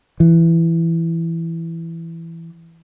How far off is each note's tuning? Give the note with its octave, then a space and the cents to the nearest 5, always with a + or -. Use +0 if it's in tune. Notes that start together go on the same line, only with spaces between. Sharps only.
E3 +10